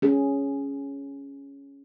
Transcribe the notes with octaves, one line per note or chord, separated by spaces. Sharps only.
C#4 G#4